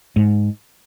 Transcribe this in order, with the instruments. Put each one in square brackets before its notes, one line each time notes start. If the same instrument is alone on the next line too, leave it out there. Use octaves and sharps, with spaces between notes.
[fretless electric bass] G#2